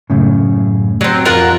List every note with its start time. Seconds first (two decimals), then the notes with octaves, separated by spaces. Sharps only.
0.10 F#2 A2 C#3
1.01 F#3 C4
1.25 F2 F4 A#4 F#5 C6